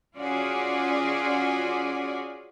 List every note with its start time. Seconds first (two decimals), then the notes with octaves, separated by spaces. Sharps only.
0.17 C#4 F4 F#4 G#4 D5